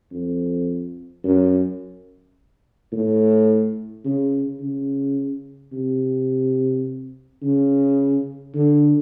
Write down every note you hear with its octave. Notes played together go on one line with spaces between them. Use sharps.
F2
F#2
A2
C#3
C#3
C3
C#3
D3